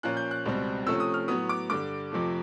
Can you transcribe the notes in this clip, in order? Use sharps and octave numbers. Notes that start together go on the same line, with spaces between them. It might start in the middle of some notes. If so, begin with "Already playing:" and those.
A#2 F3 A#3 C#4 F#6
G6
F#6
C#2 B2 G3 C4
C3 F3 A3 C#4 E6
D#6
F6
A2 F#3 B3 D#6
D6
G2 D3 G3 D6
F2 C3 F3 A3